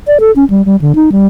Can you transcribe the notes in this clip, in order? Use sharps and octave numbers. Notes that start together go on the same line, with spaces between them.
D5
A4
C#4
G3
G3
D3
D#4
G3